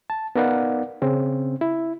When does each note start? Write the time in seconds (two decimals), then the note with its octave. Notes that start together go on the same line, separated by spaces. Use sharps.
0.10 A5
0.36 B3 D#4 A#4 D5 F5 F#5
1.02 C#3 C4 C#4
1.61 E4